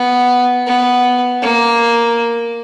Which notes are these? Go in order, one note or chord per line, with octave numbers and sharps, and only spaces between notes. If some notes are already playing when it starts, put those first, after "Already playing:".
Already playing: B3
B3
A#3